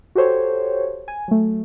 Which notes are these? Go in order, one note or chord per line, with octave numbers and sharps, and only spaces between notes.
F#4 G4 A4 C5 C#5
G#5
F#3 A3